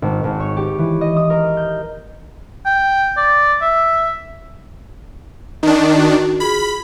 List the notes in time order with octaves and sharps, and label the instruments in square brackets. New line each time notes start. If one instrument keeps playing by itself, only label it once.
[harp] G#1
G#1
C#5
G4
E3
D#5
D#6
A#4
G6
[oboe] G5
D5
E5
[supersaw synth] D#3 D4 [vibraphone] D#4 D#5
[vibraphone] F#4
[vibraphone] F4 G#4 [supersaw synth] B5